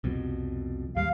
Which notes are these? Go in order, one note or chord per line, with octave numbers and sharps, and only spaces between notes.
C2 F2 B2
D#2 G#2 G3 F5